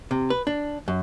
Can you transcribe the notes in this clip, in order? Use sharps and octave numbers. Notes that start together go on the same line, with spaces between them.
C3
B4
D4
F#2